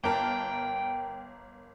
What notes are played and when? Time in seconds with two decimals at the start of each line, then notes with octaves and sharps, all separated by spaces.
0.04 G1 A#4 G5 A5